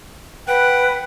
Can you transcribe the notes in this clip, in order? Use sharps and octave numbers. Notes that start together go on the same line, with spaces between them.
B4 F#5 G5